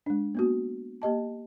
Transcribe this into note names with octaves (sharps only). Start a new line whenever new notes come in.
G#3 D4
A#3 B3 F#4
A#3 G4 D#5 A5